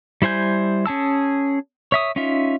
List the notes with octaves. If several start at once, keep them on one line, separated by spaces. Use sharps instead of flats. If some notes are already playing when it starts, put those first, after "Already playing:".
G3 E4 C5 G#5 G6
C#4 G#4 A5 E6
C#5 E5 D#6
C#4 D#4 F4 E5